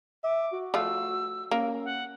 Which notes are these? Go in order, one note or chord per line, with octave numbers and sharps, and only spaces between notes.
E5 D6
F#4
F3 A3 F4 E6
A#3 C#4
F#5